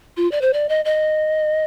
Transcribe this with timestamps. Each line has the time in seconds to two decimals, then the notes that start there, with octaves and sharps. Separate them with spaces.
0.17 F4
0.32 D5
0.42 C5
0.53 D5
0.69 D#5
0.85 D#5